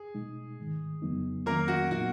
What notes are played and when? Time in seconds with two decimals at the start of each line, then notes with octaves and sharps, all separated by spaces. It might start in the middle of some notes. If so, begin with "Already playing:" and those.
Already playing: G#4
0.15 B2 G#3 D#4
0.58 G#2 D#3 G#3
1.02 F2 C#3 F#3 B3 D#4
1.46 F2 D#3 F#3 A#3 C#4 A#4
1.68 F#4
1.91 A#2 F#3 B3 D#4 F#4